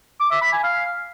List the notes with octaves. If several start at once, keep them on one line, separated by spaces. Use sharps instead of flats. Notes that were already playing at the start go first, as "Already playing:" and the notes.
D6
E5
B5
G#5
F5